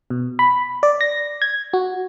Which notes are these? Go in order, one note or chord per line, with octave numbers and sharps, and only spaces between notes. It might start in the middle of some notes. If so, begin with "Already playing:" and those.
B2
B5
D5
A#6
G#6
F#4